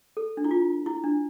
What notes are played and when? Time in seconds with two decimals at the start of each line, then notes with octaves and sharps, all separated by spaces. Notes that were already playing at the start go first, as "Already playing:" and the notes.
0.17 A4
0.37 D4
0.44 E4
0.51 F4
0.86 E4
1.04 D4